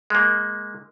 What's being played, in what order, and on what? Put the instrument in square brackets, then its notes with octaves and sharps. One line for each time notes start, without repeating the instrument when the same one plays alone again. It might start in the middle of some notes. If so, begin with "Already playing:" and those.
[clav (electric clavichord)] G#3 A#3